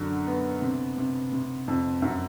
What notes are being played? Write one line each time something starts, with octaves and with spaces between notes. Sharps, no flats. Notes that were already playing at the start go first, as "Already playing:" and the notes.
Already playing: F#2 D3 F#3
B3
C3
C3
C3
F2
F#2